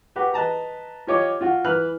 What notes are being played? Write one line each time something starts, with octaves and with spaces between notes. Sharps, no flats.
F#4 G4 B4
B4 D#5 A5 A#5
F4 G4 C#5 D#5 D6
F4 F#4
E3 B4 F6 F#6